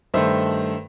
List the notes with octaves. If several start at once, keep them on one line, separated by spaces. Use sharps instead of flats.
G2 D#3 A3 C5 E5